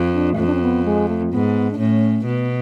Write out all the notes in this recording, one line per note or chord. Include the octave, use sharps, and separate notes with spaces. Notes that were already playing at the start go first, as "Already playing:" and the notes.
Already playing: F2
D4
G#3
F2 A3
D4
C#4
B3
G#3
A3
G#2 B3
D4
A2 C#4
B2 B3